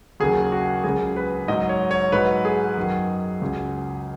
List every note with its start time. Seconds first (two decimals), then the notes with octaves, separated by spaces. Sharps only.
0.20 D#2 C#3 F#3 G#4
0.52 F#4
0.84 C#2 C#3 F#3 G#4
1.16 B4
1.48 G#2 F#3 D#5
1.69 C#5
1.91 C#5
2.12 G#2 F#3 B4
2.45 G#4
2.77 F#2 D#3 F#3
3.41 C#2 C#3 F#3